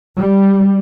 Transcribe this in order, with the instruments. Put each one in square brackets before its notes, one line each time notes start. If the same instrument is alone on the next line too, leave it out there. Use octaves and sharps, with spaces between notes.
[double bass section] G3